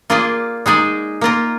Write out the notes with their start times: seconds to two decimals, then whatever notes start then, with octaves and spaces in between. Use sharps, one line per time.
0.10 A#3 F4 G#4 D5
0.66 G#3 D#4 G#4 D5
1.21 A#3 F4 A#4